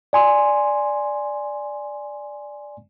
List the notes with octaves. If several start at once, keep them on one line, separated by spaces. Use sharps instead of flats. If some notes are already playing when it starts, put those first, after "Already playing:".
D5 G#5 C6